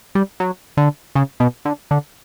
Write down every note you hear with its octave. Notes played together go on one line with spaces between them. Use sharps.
G3
F#3
D3
C#3
B2
D3
D3